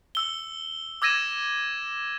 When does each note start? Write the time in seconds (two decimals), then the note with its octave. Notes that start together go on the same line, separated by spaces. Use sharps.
0.15 E6 G7
1.02 D6 E6 G#6 A#6 D#7 E7